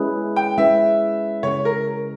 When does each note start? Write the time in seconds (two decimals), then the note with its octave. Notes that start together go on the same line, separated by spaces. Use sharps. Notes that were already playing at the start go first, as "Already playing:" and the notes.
Already playing: G#3 C#4 E4 G#4 B4
0.36 G5
0.58 G#3 C#4 E4 G#4 B4 E5
1.43 C#3 G#3 C#4 C#5
1.65 A#4